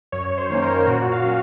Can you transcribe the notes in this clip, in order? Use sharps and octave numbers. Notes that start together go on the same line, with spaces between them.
F#2 C#5
C5
D#3 A#3 C#4
A#4
A#2 F#4
F5
F#3 C#4